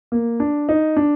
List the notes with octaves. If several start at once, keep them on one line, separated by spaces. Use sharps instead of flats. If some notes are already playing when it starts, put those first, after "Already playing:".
A#3
D4
D#4
D4